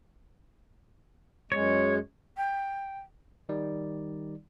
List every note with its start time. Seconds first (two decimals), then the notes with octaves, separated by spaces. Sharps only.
1.52 F#2 G#3 C#5
2.37 G5
3.49 D#3 G3 D#4 D5